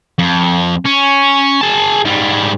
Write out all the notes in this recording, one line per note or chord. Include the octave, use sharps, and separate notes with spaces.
F2
C#4
G#4 A5
G#2 G3